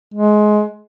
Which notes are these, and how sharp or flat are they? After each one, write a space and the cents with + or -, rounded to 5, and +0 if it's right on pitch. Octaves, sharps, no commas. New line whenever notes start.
G#3 +20